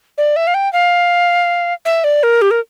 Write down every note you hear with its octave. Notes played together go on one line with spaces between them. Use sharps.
D5
E5
F5
G5
F5
E5
D5
A#4
G4
A#4